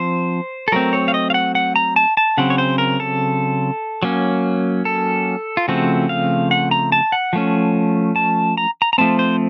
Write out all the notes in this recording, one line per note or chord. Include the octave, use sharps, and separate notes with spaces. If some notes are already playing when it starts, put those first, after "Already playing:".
Already playing: F3 C4 C5
A4
F#3 A3 C4 A#4
C#5
F5
D#5
F5
F#5
F#5
A#5
A5
A5
C#3 F#3 C4 F#5
C#5
C5
A#4
A4
F#3 A#3 C#4
A4
F4
C#3 F3 A3 C4 F#4
F5
F#5
A#5
A5
F#5
F3 A3 C#4
A5
A#5
A#5
A#5
F3 A3 C4 A5
C5